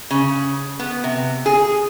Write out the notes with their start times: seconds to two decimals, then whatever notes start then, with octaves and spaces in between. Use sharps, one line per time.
0.11 C#3
0.80 B3
1.04 C3
1.46 G#4